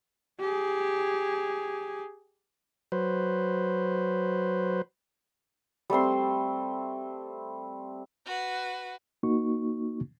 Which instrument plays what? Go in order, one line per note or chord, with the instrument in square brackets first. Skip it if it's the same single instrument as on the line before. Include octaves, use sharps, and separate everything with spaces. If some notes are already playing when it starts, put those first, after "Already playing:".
[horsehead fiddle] G4 G#4
[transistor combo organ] F#3 B4 C5
[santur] G3 A3 C4 C6
[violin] F#4 B4
[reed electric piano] A#3 D#4 F#4 C#6